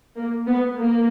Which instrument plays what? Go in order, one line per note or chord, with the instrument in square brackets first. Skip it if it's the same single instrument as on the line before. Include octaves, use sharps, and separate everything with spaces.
[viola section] A#3
B3
A#3